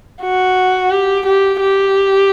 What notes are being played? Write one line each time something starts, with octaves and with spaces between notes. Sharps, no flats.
F#4
G4
G4
G4